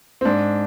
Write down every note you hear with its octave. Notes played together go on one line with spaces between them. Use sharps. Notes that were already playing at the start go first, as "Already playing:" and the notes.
C4
G#2 D4